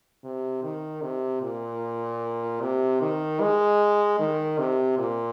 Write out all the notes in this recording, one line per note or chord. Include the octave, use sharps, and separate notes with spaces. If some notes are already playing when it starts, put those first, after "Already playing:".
C3
D#3
C3
A#2
C3
D#3
G#3
D#3
C3
A#2